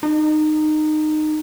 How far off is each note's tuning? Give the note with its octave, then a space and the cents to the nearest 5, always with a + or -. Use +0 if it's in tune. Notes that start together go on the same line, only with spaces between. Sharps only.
D#4 -20